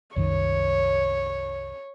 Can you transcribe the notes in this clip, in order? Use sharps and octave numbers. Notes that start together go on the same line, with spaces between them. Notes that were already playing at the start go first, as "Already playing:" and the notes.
C2 F#2 D#3 C#5